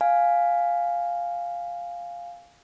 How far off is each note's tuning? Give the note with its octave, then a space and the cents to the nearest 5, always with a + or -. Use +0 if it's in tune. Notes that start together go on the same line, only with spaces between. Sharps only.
F5 +0 G#5 +0